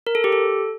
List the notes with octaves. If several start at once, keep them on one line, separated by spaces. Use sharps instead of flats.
A#4
A4
G4
A4